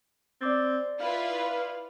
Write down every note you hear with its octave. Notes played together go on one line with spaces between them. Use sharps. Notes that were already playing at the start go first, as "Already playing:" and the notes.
C4 D5 D6 A6
E4 F4 B4 F5